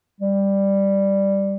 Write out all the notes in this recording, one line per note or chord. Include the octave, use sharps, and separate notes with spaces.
G3